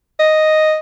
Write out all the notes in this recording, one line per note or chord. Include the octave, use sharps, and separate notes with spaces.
D#5